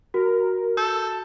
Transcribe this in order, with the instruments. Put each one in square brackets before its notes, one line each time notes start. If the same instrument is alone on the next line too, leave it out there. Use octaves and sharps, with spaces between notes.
[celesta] F#4 [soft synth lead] A#4
[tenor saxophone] A4 [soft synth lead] G6